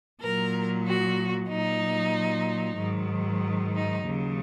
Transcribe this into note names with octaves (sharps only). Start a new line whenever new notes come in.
A#2 F#3 A#4
F#4
A#2 F#3 D#4
G#2 D#3 F#3
D#4
D#2 C#3 F#3